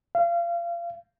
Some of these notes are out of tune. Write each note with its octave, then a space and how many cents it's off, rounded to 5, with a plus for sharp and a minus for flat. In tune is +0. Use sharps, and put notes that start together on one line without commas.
F5 -30